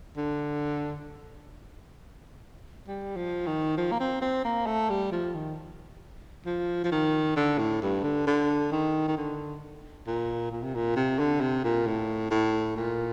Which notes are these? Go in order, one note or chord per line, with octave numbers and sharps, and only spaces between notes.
D3
G3
F3
D#3
F3
A#3
C4
C4
A#3
A3
G3
F3
D#3
F3
F3
D#3
D3
A2
G2
D3
D3
D#3
D#3
D3
A#2
A#2
C3
A#2
C3
D3
C3
A#2
A2
A2
A#2